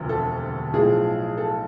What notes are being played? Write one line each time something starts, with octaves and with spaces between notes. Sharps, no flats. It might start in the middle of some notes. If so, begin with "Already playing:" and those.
Already playing: E1 D2 C3 F3
A4
B1 A2 F3 G#4
A4